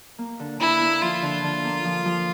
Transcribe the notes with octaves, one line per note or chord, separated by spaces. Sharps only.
A#3
D3
D3 E4
A#3
F3 F4
D3
D3
A#3
F3
F3